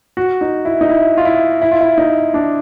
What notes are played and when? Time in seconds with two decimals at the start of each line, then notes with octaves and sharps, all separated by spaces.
0.17 F#4
0.41 D#4
0.65 E4
0.81 D#4
0.89 E4
1.17 F4
1.25 E4
1.62 E4
1.72 F4
1.81 E4
1.98 D#4
2.34 D4